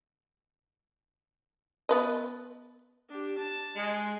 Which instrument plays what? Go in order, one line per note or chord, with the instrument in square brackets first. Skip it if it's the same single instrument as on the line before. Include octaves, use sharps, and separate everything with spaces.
[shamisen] B3 B4 D#5
[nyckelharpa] D4 G4
A5
[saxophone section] G#3